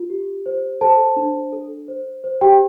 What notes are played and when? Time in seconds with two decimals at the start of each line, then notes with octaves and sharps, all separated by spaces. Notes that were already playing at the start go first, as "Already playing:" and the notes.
Already playing: F4
0.10 G4
0.46 C5
0.81 A4 C5 A5
1.17 D4
1.53 A4
1.88 C5
2.24 C5
2.41 G4 G5